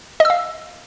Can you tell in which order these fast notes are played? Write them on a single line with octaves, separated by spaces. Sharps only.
D#5 E6 F5